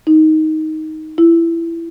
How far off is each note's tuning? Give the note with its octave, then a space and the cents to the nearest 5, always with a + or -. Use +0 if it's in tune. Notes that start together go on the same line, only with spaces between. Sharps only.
D#4 +10
E4 +20